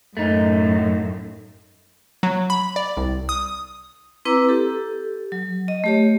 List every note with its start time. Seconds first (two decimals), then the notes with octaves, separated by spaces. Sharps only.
0.17 F#2 A2 A3 D#4
2.23 F#3
2.50 B5
2.76 D5
2.97 C2
3.29 D#6
4.25 C4 E4 B4 A#5 D6 E6
4.49 G4 A4
5.32 F#3
5.68 D#5
5.84 A3 G4 C#5